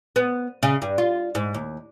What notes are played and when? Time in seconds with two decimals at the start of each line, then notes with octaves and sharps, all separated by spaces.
0.16 B3
0.63 C#3
0.82 G2
0.98 F4
1.35 G#2
1.54 D#2